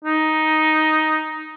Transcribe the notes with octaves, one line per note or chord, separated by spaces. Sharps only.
D#4